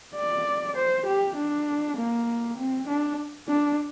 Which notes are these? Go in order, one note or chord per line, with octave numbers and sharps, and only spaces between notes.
D5
C5
G4
D4
A#3
C4
D4
D4